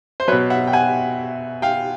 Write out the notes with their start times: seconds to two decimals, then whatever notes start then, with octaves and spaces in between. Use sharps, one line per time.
0.20 C5
0.28 F#3 B4 C#5
0.32 B2
0.50 E5 F#5
0.67 G5
0.73 F#5 G#5
1.62 F5 G5